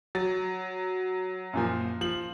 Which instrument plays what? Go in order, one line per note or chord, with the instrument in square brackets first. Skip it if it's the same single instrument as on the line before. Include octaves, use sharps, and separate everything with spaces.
[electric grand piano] F#3 [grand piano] A6
[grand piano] F#2 A#2 F3
F3 F#7